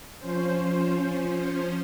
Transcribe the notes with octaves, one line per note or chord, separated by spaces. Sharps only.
F3 C#4 C5